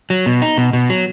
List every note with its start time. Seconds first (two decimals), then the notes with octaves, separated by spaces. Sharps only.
0.10 F#3
0.26 B2
0.42 D#4
0.57 B2
0.73 B2
0.90 F#3